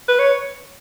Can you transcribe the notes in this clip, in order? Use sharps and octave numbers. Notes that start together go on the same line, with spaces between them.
B4
C#5